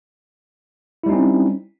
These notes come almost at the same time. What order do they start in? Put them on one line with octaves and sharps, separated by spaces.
E4 G3 D#4 C#4 C4